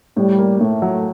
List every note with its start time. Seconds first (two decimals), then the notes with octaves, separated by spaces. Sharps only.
0.17 A2 G3
0.38 A#3
0.60 A2 A3
0.82 F#3